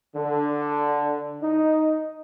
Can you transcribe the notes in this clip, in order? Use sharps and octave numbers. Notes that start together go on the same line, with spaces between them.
D3
D#4